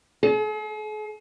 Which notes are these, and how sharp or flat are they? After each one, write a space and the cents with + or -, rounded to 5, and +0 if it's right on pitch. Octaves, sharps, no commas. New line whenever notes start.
G#4 +45